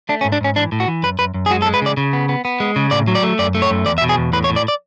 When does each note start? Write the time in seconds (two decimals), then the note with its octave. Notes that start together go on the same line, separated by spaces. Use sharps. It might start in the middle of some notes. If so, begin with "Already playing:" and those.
0.09 A3 D4
0.21 C#4
0.25 G#2
0.32 D4
0.41 G#2 C#4
0.56 E3 D4
0.72 A2
0.80 F#4
0.88 E3
1.03 F#2 B4
1.19 F#2 B4
1.34 F#2
1.46 G#4
1.50 G#3 F#4
1.62 A4
1.66 G#3
1.74 B4
1.82 C#3 D5
1.97 C#3
2.13 B3
2.29 B3
2.45 B3
2.60 G#3
2.76 C#3
2.91 A2 D5
3.07 F#3
3.15 D5
3.23 A3
3.39 F#2 D5
3.55 A3
3.62 C#5
3.70 F#2
3.86 E2 D5
3.98 E5
4.02 B2
4.09 G#4
4.18 E2
4.33 A2 B4
4.44 C#5
4.49 A2
4.56 D5
4.68 D5